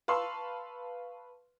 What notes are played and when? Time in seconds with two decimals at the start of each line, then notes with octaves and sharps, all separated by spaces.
0.08 B4 F5 A5 C6 C#6 E6